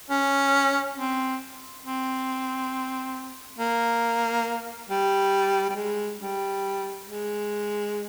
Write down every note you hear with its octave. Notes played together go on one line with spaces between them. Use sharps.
C#4
C4
C4
A#3
G3
G3
G#3
G3
G#3